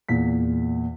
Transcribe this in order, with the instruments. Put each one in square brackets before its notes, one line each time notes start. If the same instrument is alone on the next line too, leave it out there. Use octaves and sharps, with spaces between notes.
[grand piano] E2 A#2 B6